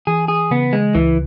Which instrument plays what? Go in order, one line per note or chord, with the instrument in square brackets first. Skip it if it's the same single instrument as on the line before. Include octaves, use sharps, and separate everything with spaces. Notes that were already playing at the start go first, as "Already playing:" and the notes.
[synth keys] E3 [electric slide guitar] G#4
[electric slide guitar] G#4
[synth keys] C#3 [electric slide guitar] B3
[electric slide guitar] G#3
[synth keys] C#2 [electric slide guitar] E3